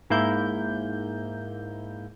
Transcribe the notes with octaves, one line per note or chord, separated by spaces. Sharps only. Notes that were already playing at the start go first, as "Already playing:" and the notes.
G#2 A#3 E4 G6